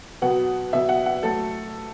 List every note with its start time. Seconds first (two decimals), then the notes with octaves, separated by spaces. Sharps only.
0.22 B2 F#3 B3 F#5
0.73 B2 F#3 B3 E5
0.89 F#5
1.06 F#5
1.23 F#3 A3 A4